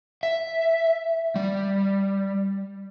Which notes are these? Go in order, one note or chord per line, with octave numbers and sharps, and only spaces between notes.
E5
G3